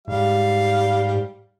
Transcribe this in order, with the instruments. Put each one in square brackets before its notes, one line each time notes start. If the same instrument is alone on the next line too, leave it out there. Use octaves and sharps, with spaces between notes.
[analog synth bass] G#2 [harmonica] G3 F5